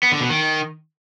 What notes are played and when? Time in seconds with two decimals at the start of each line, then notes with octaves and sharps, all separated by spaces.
0.03 B3
0.12 D3
0.21 B2
0.30 D#3